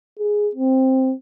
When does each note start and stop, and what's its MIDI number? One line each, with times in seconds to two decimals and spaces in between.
0.19 0.50 68
0.55 1.14 60